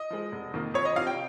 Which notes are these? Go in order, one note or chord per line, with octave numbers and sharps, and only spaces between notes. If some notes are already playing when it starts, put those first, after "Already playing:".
Already playing: D#5
F3 G#3
F1
F2 D#3 A#3
F2 C#5
D#5
C3 F3 F5
G5